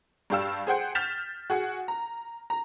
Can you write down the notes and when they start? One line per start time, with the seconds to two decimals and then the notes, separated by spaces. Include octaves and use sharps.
0.30 G2 D4 G4 F5 E6 E7
0.67 G#4 C5 F#5 G5
0.95 F6 G6 A6 B6 E7 F7
1.50 F#4 G#4 F#5
1.88 A#5
2.50 A#5